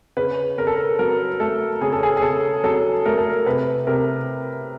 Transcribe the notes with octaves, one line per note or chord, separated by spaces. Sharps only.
C#3 B4
C#3 A#4
A4
A#4
F#3 A#4
A3 A4
C#3 G#4
A4
G#4
G#4
C#3 A4
F#3 A4
A3 A#4
A4
A#4
C3 B4
C3 A#4